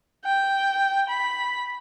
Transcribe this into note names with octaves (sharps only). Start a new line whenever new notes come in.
G5
B5